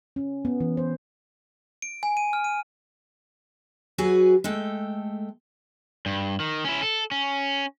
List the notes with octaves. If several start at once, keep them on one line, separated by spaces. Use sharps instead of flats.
C#4
B3
E3
C5
D7
G#5
D#7
F6
D#7
F#3 F#4 G#4 B4 G#5
G#3 A3 A4 G5
G2
D#3
C#4 E4
A4
C#4